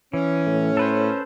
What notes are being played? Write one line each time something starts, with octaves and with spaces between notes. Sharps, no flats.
E3 C#4
A2
A4 B4 C5